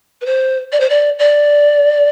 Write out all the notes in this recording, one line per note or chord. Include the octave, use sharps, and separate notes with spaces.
B4
C5
D5
C5
D5
D5